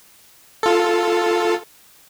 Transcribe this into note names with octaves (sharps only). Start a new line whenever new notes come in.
F4 A4